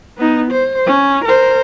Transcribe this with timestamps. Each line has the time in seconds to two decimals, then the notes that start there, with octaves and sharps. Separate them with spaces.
0.18 B3 D#4
0.51 C5
0.86 C#4
1.25 A#4 C5